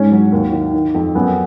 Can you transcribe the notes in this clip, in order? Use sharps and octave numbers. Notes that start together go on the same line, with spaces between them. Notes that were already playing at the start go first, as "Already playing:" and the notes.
Already playing: G#2 C#4
F#3
D#2
D#3
D#3
F2
F#2 B3